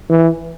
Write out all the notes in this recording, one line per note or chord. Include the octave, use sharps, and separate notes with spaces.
E3